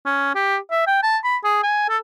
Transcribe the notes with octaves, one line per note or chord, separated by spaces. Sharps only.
C#4
G4
E5
G5
A5
B5
G#4
G#5
A4